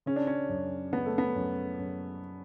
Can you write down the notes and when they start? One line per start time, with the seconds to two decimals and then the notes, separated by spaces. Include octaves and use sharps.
0.06 C#3 C#4
0.16 D4
0.27 C#4
0.49 F#2
0.92 C#3 B3
1.06 A3
1.18 B3
1.36 F#2
1.79 F#2